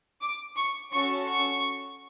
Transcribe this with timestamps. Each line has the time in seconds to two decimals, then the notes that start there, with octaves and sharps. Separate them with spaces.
0.22 D6
0.57 C#6
0.93 C#4 F#4 A4 C#6
1.28 C#6